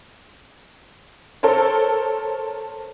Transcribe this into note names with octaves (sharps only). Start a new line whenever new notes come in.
A4 A#4 C5 C#5